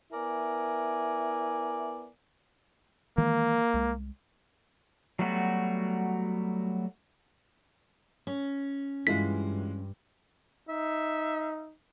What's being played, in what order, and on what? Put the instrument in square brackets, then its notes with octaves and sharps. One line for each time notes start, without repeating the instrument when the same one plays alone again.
[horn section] B3 E4 A#4 D5 E5 G#5
[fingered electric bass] D#3 E3 G#3 [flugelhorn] A#3
[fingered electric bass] C2 G#3
[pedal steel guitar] F#3 G3 A3 B3 F#4
[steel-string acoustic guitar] C#4
[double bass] G2 [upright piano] E3 G#3 F4 [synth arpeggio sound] B6
[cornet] D#4 [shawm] E5